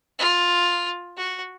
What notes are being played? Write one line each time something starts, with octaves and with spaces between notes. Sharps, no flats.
F4
F#4